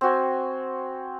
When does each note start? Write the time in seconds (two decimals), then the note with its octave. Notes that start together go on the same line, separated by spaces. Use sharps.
0.01 C4 F#4 G#5